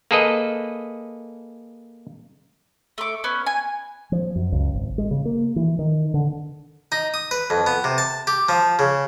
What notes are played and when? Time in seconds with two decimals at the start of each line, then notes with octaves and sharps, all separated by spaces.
0.11 A#3 G#4 A4 B4 D#5
2.98 A3 D6
3.24 B3 C#4
3.46 G#5
4.12 F3
4.36 F#2
4.52 C#2
4.74 G#1
4.98 G#3
5.11 C#3
5.25 A#3
5.56 E3
5.79 D#3
6.14 D3
6.92 D#4
7.14 D#6
7.31 B4
7.50 F2
7.67 B3
7.84 C3
7.98 A5
8.27 G4
8.49 F3
8.79 C#3